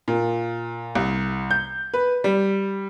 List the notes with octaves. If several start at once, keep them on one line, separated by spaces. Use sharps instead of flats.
A#2
C2
G6
B4
G3